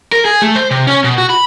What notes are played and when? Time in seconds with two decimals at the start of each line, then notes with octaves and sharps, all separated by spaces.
0.12 A#4
0.25 G#4
0.42 A3
0.56 C5
0.71 C3
0.87 C#4
1.04 B2
1.18 F#4
1.30 B5